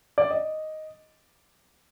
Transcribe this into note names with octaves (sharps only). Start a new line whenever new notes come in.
D5
D#5